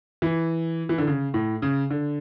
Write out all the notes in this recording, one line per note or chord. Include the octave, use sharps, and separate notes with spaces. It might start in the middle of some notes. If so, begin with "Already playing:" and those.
E3
E3
D3
C#3
A2
C#3
D3